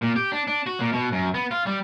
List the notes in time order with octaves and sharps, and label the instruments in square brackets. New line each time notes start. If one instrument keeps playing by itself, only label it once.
[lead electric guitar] A#2
G4
D4
D4
F#4
A#2
B2
F#2
B3
F4
G3